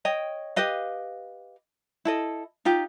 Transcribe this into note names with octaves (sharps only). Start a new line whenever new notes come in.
C#5 D#5 G5
G4 B4 D#5 F5
E4 A4 D#5
D#4 F4 G4